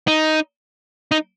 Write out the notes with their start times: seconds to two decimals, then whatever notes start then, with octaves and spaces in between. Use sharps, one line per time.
0.08 D#4
1.11 D#4